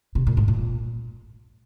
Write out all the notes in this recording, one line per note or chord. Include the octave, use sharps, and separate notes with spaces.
C3
A#2
G#2
A#2